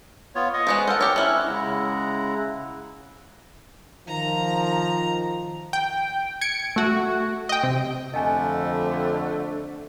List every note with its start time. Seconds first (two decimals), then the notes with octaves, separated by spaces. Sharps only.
0.35 B3 F4 C#5
0.54 D#5 C#6 D#6
0.67 G#3 B3 C5
0.87 A4 A#4 C5 F#5
1.01 G4 C#5
1.16 C#4 E4 F#6
1.46 C#3 G#3 E4 F#5 A#5
4.08 D#3 F3 A#5
5.73 G5
6.41 G#6 C#7 D7
6.76 A3 F#4
7.49 D#5 G5
7.63 C3
8.14 F2 D3 A3 D#5 G#5